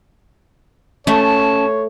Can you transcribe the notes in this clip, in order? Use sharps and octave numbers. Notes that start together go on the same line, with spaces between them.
A3 C#4 C#5 A5